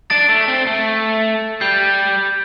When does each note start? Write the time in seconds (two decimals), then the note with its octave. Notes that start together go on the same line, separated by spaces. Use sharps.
0.10 D4 A6 D7
0.29 A3
0.48 C4
0.67 A3
1.61 G3 G6 C7